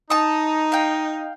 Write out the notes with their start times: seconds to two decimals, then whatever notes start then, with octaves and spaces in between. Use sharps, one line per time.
0.10 D#4 A5 D#6
0.72 F5 G5